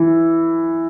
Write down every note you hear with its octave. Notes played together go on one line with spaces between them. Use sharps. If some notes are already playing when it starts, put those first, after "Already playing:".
Already playing: E3